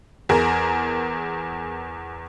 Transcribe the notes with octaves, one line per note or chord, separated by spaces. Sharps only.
E2 G#4 A#4